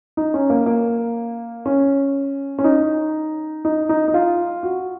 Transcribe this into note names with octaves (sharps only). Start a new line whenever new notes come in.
D#4
C#4
A#3
A#3
C#4
C#4
D#4
D#4
D#4
D#4
F4
F#4